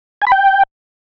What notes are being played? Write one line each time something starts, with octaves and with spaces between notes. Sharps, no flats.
G#5
B5
G5